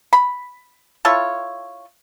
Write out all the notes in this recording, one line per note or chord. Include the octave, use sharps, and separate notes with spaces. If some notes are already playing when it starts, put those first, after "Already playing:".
B5
E4 F4 A4 C#5